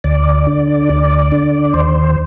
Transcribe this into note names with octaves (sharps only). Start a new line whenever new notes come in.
D2 D5
D3
D2
D3
D#2 C5